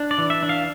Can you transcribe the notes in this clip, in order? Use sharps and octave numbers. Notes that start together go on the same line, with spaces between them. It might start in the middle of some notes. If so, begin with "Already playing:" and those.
Already playing: D4
D5
E3
E5
D4
F5